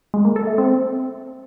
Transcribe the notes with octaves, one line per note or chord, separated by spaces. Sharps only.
G#3
A#3
A4
A3
C4